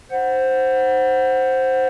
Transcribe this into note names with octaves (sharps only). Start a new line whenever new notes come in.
C5 F#5